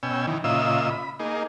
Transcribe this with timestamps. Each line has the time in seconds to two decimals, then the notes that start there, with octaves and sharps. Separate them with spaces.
0.03 B2 C#4 G5 G#5 E6
0.27 D#3 E3
0.44 A#2 C#3 F4 D#5 E5 E6
0.90 B5
1.20 A#3 D#4 G#4